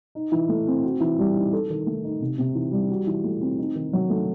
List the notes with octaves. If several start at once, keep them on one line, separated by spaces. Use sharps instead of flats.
D#4
E3
A3
C4
F#4
E3
G3
D#4
A4
D#3
A3
D#4
C3
C3
E3
G3
F#4
E3
A3
C4
D#4
D#3
F#3
A3